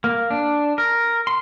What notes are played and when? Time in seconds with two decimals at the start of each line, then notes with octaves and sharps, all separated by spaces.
0.04 A#3
0.31 D4
0.78 A#4
1.27 C6